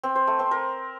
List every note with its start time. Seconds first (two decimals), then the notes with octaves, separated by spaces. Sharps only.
0.03 C4
0.15 C5
0.27 A3
0.39 C4
0.51 A#4